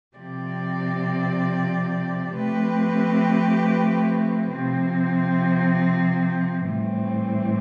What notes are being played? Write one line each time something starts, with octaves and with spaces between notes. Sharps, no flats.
C3 F3 C4 G4 D5
F3 A3 C4 G4 B4
C3 F3 C4
A2 E3 G3 C4